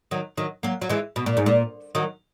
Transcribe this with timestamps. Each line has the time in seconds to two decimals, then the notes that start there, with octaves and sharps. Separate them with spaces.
0.11 D#3 F#3
0.37 D#3 F#3
0.63 F#3 A#3
0.81 F#3
0.89 E3 G#3
1.16 B2
1.26 A#2
1.37 G#2
1.46 A#2
1.95 D#3 F#3